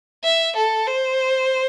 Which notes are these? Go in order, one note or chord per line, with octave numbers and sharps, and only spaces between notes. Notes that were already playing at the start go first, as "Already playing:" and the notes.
E5
A4
C5